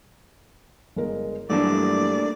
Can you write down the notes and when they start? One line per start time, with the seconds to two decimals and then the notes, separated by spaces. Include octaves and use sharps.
0.96 G1 G#3 A#4
1.50 G2 E3 F#3 A3 A#3 D4 D5